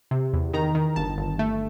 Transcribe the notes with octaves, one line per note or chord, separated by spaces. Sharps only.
C3
E2
D#3 A#5
D#3
G1 A5
G1
A3